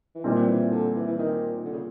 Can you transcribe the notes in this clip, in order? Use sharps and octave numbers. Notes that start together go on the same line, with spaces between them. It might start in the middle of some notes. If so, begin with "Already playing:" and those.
E3
A#2 D#3 G3 C4
E3
D3
E3
E3
D#3
D3
C#3